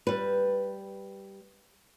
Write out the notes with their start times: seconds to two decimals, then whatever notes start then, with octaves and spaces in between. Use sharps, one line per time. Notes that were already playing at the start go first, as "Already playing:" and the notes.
0.07 G3 B4